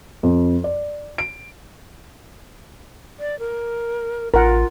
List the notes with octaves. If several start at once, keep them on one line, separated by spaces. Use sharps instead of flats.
F2
D5
D7
D5
A#4
A1 F4 A#4 F#5